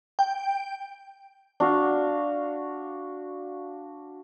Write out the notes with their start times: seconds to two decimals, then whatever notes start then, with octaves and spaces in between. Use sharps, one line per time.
0.19 G5
1.60 D4 F#4 F5